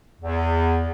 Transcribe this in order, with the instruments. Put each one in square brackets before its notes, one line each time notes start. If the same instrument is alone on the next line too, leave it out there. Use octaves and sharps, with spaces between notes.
[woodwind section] E2